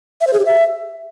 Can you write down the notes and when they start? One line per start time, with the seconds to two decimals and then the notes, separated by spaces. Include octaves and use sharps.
0.21 E5
0.27 C5
0.33 G#4
0.39 G4
0.46 E5